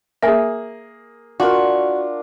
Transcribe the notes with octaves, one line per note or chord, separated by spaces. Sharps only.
A#3 G#4 E5 G#5
D4 F4 F#4 A#4